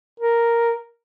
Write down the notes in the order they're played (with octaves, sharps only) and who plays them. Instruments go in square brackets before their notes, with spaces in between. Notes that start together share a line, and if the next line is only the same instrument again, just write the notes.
[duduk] A#4